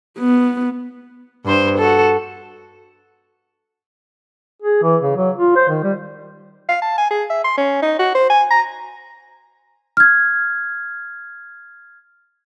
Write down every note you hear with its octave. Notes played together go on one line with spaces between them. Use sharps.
B3
G2 C5
F#4 A4
G#4
E3
C#3
F#3
F4
C5
D#3
G3
F5
A5
G#5
G#4
E5
C6
C#4
D#4
F#4
C5
G#5
A#5
F6 G#6